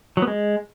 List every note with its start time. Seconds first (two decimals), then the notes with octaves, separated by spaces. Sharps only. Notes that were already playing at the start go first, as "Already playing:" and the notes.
0.17 F#3
0.22 B3
0.27 G#3